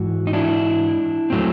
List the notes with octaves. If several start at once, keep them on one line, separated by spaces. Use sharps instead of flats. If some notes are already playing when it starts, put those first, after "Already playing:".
Already playing: G#2 E3 F#4
D#4
D4 E4
A2 F#3 A3 C4